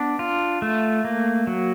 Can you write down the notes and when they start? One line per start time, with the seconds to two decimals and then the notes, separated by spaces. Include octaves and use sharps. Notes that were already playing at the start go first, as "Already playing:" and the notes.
Already playing: B3 D4
0.19 F4
0.62 A3
1.04 A#3
1.47 F#3